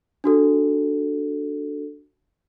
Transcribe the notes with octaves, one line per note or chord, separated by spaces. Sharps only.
D4 F#4 A4